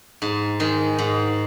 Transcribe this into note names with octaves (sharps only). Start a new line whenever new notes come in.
G#2
D#3 G#3
G#2